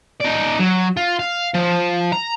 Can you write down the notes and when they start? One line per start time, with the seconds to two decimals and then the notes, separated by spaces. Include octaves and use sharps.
0.20 D#4 D5
0.59 F#3
0.97 F4
1.19 F5
1.54 F3
2.12 A#5